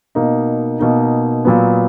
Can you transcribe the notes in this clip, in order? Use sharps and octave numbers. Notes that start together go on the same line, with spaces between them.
B2 A#3 D#4
B2 A#3 D#4
A#2 F#3 B3